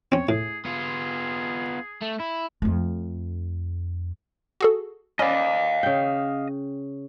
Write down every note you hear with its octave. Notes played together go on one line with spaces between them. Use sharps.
C4 C#4 C#5
A2 G#4
B3 F4 G#4
A3
E4
F2 A3
F#4 G#4 A4
C#4 B4 D5 D#5 F5
C#3 G5